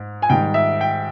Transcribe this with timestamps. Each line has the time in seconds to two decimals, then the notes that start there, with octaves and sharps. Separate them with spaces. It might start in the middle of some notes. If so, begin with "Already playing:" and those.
Already playing: G#2
0.22 G#5
0.29 G#2 D#3 G3 G5
0.54 E5
0.81 G5